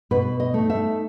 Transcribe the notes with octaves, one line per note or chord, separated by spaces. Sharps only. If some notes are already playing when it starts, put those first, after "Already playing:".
B2 B4
D#5
A3 D#4
E5